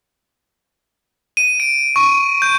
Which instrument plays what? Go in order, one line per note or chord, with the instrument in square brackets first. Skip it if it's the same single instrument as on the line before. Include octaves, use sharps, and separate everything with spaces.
[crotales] D#7
D7
C#6
G6